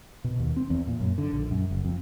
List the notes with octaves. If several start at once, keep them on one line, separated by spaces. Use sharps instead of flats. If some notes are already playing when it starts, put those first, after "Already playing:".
B2
D#2
C4
E2
A#2
F#2
D3
A#1
F#2
F#1
F2